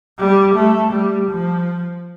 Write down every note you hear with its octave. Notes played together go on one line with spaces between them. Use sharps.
G3
A3
G3
F3